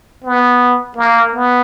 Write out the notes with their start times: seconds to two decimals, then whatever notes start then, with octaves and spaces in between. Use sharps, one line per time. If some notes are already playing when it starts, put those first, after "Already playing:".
0.24 B3
0.97 A#3
1.33 B3